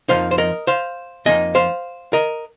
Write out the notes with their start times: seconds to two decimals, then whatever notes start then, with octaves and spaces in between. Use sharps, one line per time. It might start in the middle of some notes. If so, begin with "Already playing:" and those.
0.09 F2 F3 A#3 D#4 C5 F5
0.31 C5
0.38 A#4 D#5
0.67 C5 F5
1.25 F2 F3 A#3 D#4 D#5 G#5
1.55 C5 F5
2.13 A#4 D#5